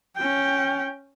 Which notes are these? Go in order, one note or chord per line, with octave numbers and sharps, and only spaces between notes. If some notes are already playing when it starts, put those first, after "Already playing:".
C#4 G5